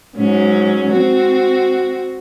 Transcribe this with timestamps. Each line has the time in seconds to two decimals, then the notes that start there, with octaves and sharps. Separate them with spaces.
0.18 G#2 F#3 C#4
0.92 C4 F#4